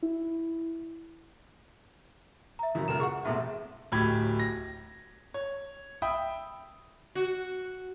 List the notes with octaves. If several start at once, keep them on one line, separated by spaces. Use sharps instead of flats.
E4
E5 A#5
F#2 C#3 E4
C#2 A#4 E7
G#4 F#5 C#6
A1 A2 C3
D1 A2 G4 B5 G#6
A#6
C#5
E5 G5 B5 D#6
F#4